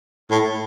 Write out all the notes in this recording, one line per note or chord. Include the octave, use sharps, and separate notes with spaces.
A2